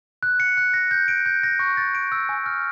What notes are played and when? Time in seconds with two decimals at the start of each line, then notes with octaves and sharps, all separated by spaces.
0.23 F#6
0.40 C#7
0.57 F#6
0.74 A#6
0.91 G6
1.08 D7
1.26 G6
1.43 A#6
1.59 C#6
1.77 A6
1.95 D7
2.12 E6
2.29 G#5
2.46 F6